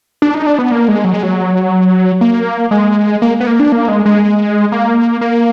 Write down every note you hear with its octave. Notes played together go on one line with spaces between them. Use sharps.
D4
D#4
D4
B3
A#3
G#3
F#3
G#3
F#3
A#3
G#3
A#3
B3
A#3
D4
A#3
G#3
G#3
A#3
A#3